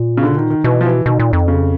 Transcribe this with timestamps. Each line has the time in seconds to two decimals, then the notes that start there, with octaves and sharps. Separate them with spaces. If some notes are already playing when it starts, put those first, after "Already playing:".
Already playing: A#2
0.17 C#3
0.23 D3
0.37 D#3
0.50 D#3
0.64 B2 E3
0.81 F3
0.85 E3
1.06 B2 D#3
1.19 A#2
1.33 F2
1.48 C#3